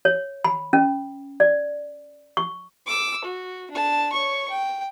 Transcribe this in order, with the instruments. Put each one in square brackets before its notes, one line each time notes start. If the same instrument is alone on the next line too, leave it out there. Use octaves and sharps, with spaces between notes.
[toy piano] C#5
B5
C#4
D5
C#6
[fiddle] D6 E6
F#4
D4 A5
C#5 C#6
G5